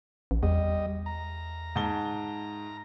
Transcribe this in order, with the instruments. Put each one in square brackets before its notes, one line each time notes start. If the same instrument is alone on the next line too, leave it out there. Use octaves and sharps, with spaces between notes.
[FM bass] A1
[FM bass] E2 [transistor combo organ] G3 D#5
[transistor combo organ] A#5
[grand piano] G#2 A5 G7